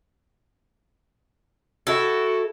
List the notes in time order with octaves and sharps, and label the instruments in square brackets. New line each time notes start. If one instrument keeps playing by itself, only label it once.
[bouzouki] E4 A4 [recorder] F#4